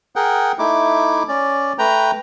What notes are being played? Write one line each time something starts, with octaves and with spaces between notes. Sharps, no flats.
G#4 A#4 F#5 G5
A3 D#4 E4 D6
C#4 D5
A3 B4 G5 A#5